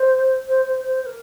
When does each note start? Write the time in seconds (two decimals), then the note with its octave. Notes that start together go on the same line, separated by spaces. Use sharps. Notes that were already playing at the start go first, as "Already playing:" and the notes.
Already playing: C5
0.48 C5
0.65 C5
0.84 C5
1.03 C5
1.06 A#4